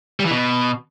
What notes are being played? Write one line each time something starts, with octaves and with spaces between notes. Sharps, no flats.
G3
E3
B2